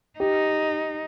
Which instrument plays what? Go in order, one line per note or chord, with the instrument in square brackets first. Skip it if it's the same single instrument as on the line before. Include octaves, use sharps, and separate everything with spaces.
[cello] D#4 [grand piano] G4